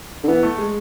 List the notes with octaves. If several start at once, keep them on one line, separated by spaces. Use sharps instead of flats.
D3
E3 B3
A3
G#3